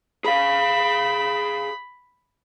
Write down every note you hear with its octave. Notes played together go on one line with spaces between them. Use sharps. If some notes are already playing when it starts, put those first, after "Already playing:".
G#4 F5 B5